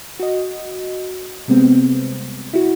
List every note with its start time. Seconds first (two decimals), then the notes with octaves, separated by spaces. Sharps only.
0.20 F#4 D#5
1.48 C3 G3 G#3 B3 C4
2.53 E4 F#4